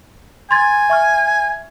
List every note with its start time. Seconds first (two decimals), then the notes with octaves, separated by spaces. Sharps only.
0.51 G#5 C6 G#6 A6
0.90 E5 C#6 F6